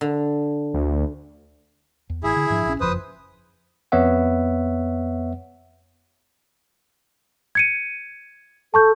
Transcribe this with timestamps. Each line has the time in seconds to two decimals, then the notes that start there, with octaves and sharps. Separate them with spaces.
0.01 D3
0.74 D2
2.10 E2
2.24 A1 E4 G#4 E5
2.36 D3
2.50 G#2 F3 D4
2.66 A#1 C#4
2.81 F#1 F2 F3 B4 C5 D#6
3.92 F2 B3 C#5 E5 F#5
7.55 G#6 C#7 D#7
8.74 A4 A5 C#6 G6